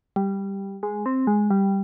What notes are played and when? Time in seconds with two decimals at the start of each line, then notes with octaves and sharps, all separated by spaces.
0.16 G3
0.83 G#3
1.06 C4
1.27 G#3
1.50 G3